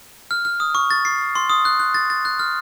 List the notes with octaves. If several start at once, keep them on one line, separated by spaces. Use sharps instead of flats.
F6
F6
D#6
C#6
A6
C7
C6
D#6
F#6
F#6
A6
A6
F#6
F6